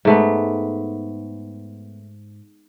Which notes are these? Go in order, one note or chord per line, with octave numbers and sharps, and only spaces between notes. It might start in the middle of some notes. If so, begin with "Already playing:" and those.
G#2 A3 B3